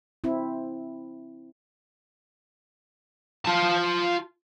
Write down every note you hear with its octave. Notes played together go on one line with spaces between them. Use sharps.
C4 E4
F4 A5